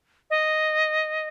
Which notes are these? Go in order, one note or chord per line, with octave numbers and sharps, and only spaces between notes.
D#5